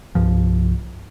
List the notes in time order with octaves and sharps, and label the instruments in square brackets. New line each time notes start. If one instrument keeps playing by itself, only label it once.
[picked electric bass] C2 G2 F3